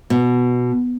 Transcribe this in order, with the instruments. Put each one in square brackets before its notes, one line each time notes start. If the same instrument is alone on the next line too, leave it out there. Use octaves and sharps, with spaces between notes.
[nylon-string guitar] B2